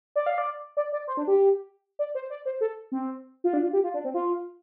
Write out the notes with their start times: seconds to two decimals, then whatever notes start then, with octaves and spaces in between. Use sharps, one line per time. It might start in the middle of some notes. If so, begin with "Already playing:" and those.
0.16 D5
0.26 F5
0.38 D5
0.77 D5
0.92 D5
1.07 C5
1.17 D4
1.27 G4
1.99 D5
2.15 C5
2.30 D5
2.45 C5
2.61 A4
2.92 C4
3.44 F4
3.53 D4
3.63 F4
3.73 G4
3.84 F4
3.94 D4
4.04 C4
4.14 F4